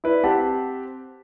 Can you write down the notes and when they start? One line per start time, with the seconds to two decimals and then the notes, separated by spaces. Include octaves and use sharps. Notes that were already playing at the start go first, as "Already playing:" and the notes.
0.04 E4 B4 D5
0.23 C4 G4 F#5 A5